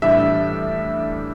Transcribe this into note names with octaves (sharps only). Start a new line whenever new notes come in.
A2 E3 G3 D4 E5